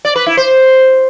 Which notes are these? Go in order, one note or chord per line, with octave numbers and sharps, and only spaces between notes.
D5
B4
E4
C5